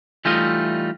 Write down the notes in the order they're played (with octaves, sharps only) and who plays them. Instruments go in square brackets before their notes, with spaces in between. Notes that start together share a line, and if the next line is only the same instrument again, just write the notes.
[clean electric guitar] E3 G3 A3 D#4 F4 D#5